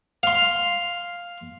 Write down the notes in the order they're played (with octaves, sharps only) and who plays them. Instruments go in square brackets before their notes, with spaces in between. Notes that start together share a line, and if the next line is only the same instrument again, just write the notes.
[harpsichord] F5 C6